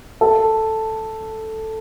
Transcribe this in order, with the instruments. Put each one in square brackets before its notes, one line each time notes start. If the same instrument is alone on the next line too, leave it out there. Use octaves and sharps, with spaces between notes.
[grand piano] A4